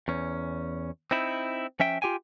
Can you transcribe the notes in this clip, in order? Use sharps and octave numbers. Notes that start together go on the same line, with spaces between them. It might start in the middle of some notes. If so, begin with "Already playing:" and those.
E2 C#4
C4 D#4 E4
F3 C#4 E5 G5
F4 G4 G5 G#5